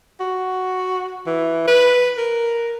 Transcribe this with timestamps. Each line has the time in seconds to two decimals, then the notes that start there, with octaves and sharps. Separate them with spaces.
0.20 F#4
1.27 E3
1.67 B4
2.18 A#4